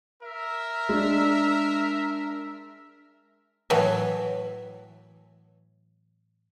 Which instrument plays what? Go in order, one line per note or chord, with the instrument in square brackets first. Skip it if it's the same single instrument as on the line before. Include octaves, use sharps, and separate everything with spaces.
[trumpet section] A#4 E5
[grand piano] G#3 D4
[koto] A2 E3 F#3 E5